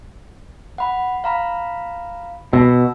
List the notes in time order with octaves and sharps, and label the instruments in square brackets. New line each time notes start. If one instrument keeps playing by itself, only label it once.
[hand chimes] F#5 B5
F5 A#5 B5
[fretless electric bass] B2 [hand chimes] E6